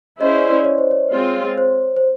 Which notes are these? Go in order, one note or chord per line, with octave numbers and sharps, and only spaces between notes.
C#4 E4 G#4 C5 D#5
D5
D5
C#5
C5
C#5
G#3 C4 F4
C5
C5